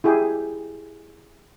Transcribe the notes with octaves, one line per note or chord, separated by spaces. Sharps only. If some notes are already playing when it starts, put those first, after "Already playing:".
E4 G4 G#4 G5